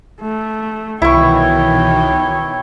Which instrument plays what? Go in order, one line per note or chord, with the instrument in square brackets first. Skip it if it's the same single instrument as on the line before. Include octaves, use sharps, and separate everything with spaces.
[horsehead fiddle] A3
[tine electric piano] C2 [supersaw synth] B2 D#3 E3 [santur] E4 C#6 [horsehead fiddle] C#5 G5